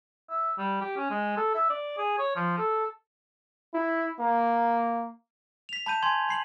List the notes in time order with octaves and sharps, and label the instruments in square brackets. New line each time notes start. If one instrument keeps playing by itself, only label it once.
[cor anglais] E5
G3
G4
C#4
G#3
A4
E5
D5
G#4
C#5
F3
A4
[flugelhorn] E4
A#3
[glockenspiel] B6 F7
A5 B5 G6 D#7
G#5 C6 G#6
B5 C7 F#7